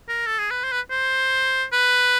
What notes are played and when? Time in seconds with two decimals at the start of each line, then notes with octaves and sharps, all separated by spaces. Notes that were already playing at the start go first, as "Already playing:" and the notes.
0.08 A#4
0.26 A4
0.39 G#4
0.51 B4
0.64 C5
0.72 B4
0.91 C5
1.72 B4